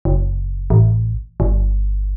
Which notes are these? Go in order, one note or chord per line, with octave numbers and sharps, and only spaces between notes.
F#1
A1
G1